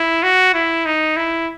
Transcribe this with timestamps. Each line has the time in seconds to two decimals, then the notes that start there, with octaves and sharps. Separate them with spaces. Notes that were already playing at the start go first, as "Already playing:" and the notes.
Already playing: E4
0.23 F#4
0.54 E4
0.86 D#4
1.17 E4